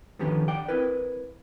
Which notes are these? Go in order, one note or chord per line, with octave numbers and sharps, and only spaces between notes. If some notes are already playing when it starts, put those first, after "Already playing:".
D3 D#3 F3 C#4 G4 B4
D5 F#5 G5
C4 E4 A#4 B4